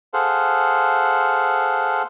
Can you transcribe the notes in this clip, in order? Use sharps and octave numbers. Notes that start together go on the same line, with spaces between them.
G#4 A4 C5 F5 F#5